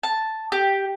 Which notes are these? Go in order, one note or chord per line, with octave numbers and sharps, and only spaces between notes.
A5
G4